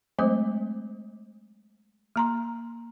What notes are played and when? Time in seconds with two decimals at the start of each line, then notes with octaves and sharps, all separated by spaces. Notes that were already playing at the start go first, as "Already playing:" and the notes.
0.18 F#3 G#3 A3 C4 C5 D#5
2.16 A#3 A#5 C6